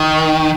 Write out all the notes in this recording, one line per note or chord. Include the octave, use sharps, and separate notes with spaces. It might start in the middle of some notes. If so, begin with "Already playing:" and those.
Already playing: D#3